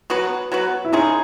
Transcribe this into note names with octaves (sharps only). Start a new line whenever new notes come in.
F#3 B3 F#4 B4
F#3 B3 F#4 B4
E4
D#3 G#3 C#4 D#4 G#4